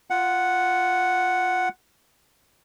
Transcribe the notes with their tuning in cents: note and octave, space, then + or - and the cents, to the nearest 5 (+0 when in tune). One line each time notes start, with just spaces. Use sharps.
F4 +0 F#5 +0